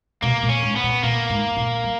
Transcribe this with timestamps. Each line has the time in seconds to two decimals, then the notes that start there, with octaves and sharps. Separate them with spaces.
0.22 B2 A#3
0.43 A#2
0.49 C#4
0.63 G#2
0.76 B3
0.83 A#2
1.03 A#2 A#3
1.30 G#2
1.56 A#2
1.84 G3